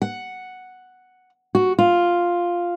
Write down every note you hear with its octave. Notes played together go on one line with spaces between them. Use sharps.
F#5
F#4
F4